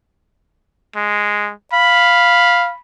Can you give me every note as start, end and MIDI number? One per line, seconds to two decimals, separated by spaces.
0.96 1.52 56
1.73 2.71 77
1.73 2.80 83